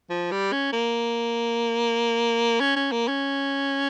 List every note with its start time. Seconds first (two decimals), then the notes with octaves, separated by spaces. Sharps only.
0.10 F3
0.31 G3
0.52 C#4
0.73 A#3
2.60 C#4
2.76 C#4
2.92 A#3
3.08 C#4